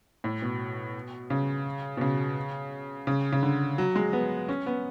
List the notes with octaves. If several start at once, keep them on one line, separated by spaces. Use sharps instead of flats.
A2
B2
C#3
B2
C#3
C#3
C#3
D3
F#3
G#3
B3
C#4
B3